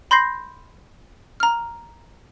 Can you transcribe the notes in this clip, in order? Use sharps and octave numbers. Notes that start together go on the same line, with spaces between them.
B5 C6 G6 A#6 C7
A#5 F6